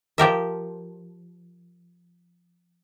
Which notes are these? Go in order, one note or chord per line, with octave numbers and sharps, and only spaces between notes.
F3 G4 A#4 E5